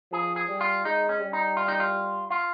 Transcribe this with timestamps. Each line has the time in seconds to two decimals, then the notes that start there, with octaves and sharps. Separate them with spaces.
0.11 F3 G#4
0.36 G#4
0.48 G3
0.61 F4
0.85 G#3 D#4
1.09 C#4
1.21 G3
1.33 D#4
1.57 F4
1.68 D#4
1.80 F4
2.31 F4